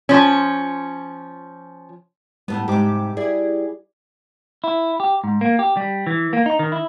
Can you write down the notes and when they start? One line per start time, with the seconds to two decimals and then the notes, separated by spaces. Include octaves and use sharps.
0.09 F3 C#4
2.48 A2 G3 B3
2.68 G#2 C3 G4 D6
3.17 E4 G#4 D5
4.64 E4
5.00 G4
5.24 G#2
5.41 A#3
5.59 G4
5.77 G3
6.07 E3
6.33 A#3
6.46 D#4
6.59 D#3
6.72 E4